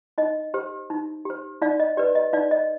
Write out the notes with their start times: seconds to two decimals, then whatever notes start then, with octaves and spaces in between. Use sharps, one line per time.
0.18 D#4 D#5
0.54 G4 C5
0.90 D#4
1.25 G4 C5
1.62 D#4 D5 F5
1.80 D#5
1.97 G4 B4 D5
2.15 D#5
2.33 D#4 D5 F5
2.51 D#5